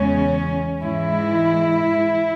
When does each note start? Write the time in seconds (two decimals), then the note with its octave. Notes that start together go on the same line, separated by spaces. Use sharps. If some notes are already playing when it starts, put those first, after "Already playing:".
Already playing: E2 C#3 G#3 C#4
0.83 G#2 E3 G#3 E4